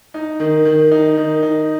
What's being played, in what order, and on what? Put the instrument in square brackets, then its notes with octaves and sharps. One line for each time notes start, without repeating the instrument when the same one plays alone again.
[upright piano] D#4
D#3
D#3
D#4
D#3
D#4